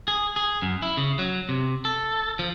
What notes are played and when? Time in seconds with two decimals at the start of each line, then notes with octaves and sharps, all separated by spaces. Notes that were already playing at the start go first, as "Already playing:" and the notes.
0.08 G#4
0.36 G#4
0.62 F#2
0.82 E4
0.97 C#3
1.19 F#3
1.49 C3
1.85 A4
2.39 F3